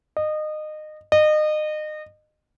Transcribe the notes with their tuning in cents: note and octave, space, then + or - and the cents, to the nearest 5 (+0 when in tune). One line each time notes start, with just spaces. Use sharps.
D#5 -25
D#5 -30